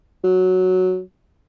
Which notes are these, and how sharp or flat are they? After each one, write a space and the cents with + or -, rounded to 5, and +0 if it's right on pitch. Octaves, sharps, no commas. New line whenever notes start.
F#3 +0